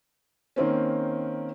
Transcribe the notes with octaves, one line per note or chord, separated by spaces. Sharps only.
D#3 A#3 C4 C#4